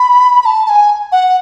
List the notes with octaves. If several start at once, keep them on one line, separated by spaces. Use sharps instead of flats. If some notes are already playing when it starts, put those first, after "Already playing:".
Already playing: B5
B5
A5
A5
G#5
F#5